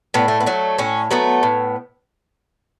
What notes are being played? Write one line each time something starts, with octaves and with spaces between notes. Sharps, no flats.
A2 B3
A3
B3
F#3 A3
A2 C#4
F#3 A3 B3
A2